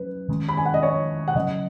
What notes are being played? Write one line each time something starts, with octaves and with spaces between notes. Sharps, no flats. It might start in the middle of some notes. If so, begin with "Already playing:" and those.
Already playing: F#3 C#4 B4
D#3 G#3 C#4
B5
G#5
F#5
D#5
C#5
F#5
C#3 F#3 C#4 D#5